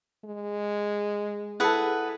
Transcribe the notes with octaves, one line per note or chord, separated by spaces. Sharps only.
G#3
E4 G#4 A4 B4 F#5